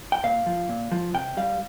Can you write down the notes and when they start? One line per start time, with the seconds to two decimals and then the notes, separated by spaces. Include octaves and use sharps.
0.12 G5
0.24 A#2 F5
0.46 F3
0.69 A#2
0.92 F3
1.14 C3 G5
1.37 G3 F5